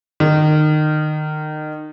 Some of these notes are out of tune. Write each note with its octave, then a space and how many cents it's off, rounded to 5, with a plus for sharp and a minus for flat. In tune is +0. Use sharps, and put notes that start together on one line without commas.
D#3 -25